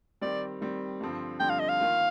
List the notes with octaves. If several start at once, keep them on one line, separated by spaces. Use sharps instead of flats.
D#3 G3 C4 D5
D#3 G3 C4
G2 D3 F3 C4
G2 D3 F3 C4 G5
F5
D#5
F5
D#3 A#3 F4